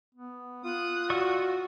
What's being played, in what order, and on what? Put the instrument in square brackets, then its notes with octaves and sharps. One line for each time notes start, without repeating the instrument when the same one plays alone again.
[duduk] B3
[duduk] F4 [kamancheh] D#6 F#6
[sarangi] F#4 [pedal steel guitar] D5 C#6 E6